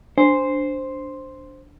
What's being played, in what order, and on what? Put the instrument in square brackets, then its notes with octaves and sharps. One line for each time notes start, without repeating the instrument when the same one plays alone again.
[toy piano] D4 [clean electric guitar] C5